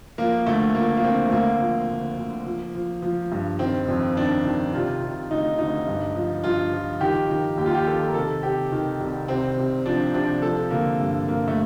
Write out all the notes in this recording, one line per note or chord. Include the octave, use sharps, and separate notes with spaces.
F3 A#3
D2 A3
F3 A#3
A#3
D3 C4
A3
D2 A#3
F3
D2
D2
F3
F3
F3
G2
D#3 C4
F2
D#3 D4
D#3
C3 F4
C3
D2 D#4
D2 D#4
G2
F3
G2 F4
F3
D#3 G4
D#3
D#2 G4
F4
G4
D#3 A4
A#4
C3 A4
C3 G4
D#3
C2
C3 C4
C3
F3 D4
C3 D4
F3 A4
D3 A#3
G2
G2 A#3
A3